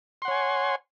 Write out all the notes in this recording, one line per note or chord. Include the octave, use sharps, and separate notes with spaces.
C#5 F#5 G#5 C6